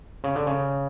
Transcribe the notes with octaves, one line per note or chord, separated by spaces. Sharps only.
C#3
D3
C#3